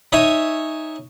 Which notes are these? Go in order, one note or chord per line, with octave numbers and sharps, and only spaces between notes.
D#4 C#5 E5 G#5